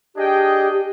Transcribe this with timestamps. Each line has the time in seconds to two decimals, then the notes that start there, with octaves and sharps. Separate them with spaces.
0.16 D4 G4 G#4 D#5 G5
0.72 G4